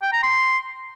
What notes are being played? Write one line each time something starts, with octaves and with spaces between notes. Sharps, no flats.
G5
A#5
C6